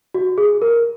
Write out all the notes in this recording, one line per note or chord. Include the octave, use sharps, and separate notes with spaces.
F#4
G#4
A#4